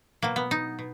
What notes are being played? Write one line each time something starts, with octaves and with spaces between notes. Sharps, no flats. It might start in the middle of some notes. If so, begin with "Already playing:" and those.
B2 F#3 A#3
B3
D#4
B2